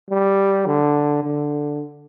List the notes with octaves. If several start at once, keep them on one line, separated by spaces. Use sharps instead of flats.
G3
D3
D3